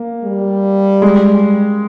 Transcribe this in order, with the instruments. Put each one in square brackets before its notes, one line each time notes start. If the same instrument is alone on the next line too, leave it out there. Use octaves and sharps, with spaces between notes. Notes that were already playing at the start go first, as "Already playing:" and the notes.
Already playing: [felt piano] A#3
[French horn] G3
[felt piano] G#3